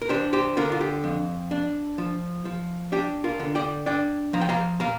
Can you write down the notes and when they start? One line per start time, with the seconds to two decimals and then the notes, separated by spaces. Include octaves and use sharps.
0.02 A#4
0.09 D4 G4 C5
0.33 G4 C5
0.57 D3 F4 A#4
0.72 F4
0.81 G4
1.04 F2
1.51 D4
1.98 F3
2.45 F3
2.92 D4 G4
3.24 F4 A#4
3.39 D3
3.55 D5 G5
3.86 D4 D5 G5
4.33 F3 A#5
4.41 G5
4.49 F5 A#5
4.80 A#2 F5 A#5